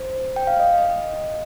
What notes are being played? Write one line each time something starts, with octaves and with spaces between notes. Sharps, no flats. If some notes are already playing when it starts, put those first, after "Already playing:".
Already playing: C5
G5
F5
D#5
D#5